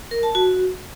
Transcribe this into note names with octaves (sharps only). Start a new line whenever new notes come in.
A#4
A5
F#4